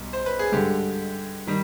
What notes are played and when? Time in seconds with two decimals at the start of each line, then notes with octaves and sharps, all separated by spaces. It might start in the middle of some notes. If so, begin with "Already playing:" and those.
Already playing: B1 B2 G3
0.13 C5
0.26 B4
0.39 G#4
0.52 G2 D3 G#3 G4
1.47 D#3 G3